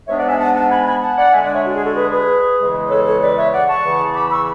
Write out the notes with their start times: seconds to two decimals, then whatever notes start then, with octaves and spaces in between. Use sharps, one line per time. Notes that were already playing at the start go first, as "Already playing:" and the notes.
0.08 G#2 G#3 B3 D4 C#5 E5
0.18 D5 F#5
0.29 E5 G#5
0.39 F#5 A5
0.55 F#5 A5
0.70 G#5 B5
0.86 G#5 B5
1.02 F#5 A5
1.18 D5 F#5
1.33 D3 G#3 D4 E5 G#5
1.44 D5 F#5
1.54 C#5 E5
1.65 F#4
1.75 G#4
1.86 F#4 A4
1.96 G#4 B4
2.12 G#4 B4
2.59 E2 C#3 E3 G#3
2.90 A4 C#5
3.06 A4 C#5
3.22 B4 D5
3.37 C#5 E5
3.53 D5 F#5
3.69 A5 C#6
3.85 E2 C#3 E3
4.16 B5 D6
4.32 C#6 E6